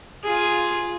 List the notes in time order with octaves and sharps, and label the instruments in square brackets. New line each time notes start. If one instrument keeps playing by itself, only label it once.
[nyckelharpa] F4 G#4